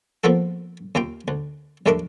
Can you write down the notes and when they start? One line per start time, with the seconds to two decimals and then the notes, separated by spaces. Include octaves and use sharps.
0.24 F3 A#3 B3 F4 A4
0.95 D#2 A#3 F4 G5
1.28 D2
1.86 A#1 D#2 A3 A#3 D4 A#4